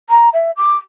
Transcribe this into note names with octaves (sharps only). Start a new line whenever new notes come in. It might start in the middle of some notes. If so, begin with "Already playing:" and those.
A#5
E5
D6